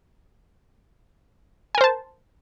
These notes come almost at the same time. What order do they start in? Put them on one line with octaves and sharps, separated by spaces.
G#5 A#4 C5 A5